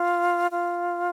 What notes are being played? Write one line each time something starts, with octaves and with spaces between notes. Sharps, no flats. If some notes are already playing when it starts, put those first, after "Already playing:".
Already playing: F4
F4